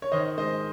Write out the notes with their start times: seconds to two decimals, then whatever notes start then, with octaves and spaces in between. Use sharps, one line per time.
0.02 C#5
0.12 D#3 C5 D#5
0.38 G#3 C5 D#5